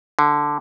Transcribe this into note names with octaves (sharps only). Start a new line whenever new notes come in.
D3